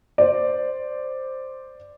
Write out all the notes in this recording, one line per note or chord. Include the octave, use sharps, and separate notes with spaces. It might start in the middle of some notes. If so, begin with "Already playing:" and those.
C5 D5